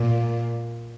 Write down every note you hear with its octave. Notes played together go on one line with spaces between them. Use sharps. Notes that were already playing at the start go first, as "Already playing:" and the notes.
Already playing: A#2